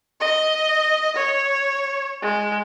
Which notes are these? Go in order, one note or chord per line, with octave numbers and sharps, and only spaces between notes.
D#5
C#5
G#3